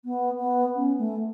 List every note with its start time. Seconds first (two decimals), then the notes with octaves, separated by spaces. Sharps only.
0.05 B3
0.40 B3
0.75 C#4
0.98 A3